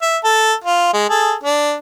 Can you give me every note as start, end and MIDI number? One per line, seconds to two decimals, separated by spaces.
0.02 0.17 76
0.24 0.54 69
0.64 0.91 65
0.93 1.10 56
1.10 1.35 68
1.10 1.35 69
1.44 1.75 62